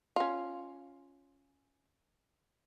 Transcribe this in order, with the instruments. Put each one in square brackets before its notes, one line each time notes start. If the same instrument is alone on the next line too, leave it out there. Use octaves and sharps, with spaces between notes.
[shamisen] C#4 F4